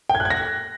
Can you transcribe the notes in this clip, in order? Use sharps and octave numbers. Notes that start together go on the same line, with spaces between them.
G5
G#6
F#6
G#6
A#6